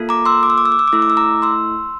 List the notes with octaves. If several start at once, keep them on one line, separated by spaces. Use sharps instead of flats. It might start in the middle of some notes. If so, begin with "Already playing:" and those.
Already playing: A#3 F4 A4
A#5 D6
C6 E6
D6
E6
D6
E6
D6
E6
D6
A3 E4 A4 E6
D6
E6
A#5 D6
C6 E6